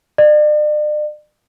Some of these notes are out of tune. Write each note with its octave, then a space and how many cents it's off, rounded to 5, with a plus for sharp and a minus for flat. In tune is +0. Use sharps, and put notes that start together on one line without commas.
D5 +40